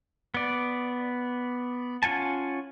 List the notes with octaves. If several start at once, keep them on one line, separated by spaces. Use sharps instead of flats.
B3 D5
C#4 F4 F#5 G#5 A5